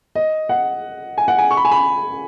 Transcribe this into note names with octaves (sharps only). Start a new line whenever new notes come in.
D#5
F#5
G#5
F#5
G#5
C#6
B5
G#5
B5